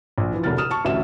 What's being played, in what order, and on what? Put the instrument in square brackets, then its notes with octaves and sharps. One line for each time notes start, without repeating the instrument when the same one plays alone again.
[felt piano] A#1
E3 F3
E1 C2 D3 F6 A6
D#6 F6 E7
A5 C#6
A1 D2 E5 E7